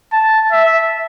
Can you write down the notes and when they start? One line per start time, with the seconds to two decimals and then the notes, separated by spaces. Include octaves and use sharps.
0.13 A5
0.52 E5